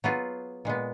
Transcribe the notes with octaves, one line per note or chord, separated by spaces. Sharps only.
F#3 B3 F4 G#4
A#2 G#3 B3